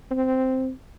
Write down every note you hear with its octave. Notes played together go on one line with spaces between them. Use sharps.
C4